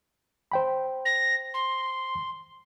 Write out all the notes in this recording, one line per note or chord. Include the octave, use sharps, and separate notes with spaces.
C5 G5 B5
A#6
C6